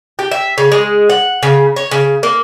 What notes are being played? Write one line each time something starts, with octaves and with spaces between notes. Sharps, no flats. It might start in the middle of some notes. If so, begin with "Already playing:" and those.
G4
E5
C#3
G#3
F#5
C#3
C#5
C#3
A#3